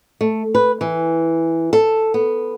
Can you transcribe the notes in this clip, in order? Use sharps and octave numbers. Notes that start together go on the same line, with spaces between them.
A3
B4
E3
A4
B3